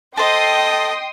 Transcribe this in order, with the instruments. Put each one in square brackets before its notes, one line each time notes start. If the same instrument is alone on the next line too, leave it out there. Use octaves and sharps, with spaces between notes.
[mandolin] A4 C5 [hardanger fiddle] D#5 [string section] G5 C6 D#6